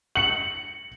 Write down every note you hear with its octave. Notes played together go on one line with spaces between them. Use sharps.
C#7 F#7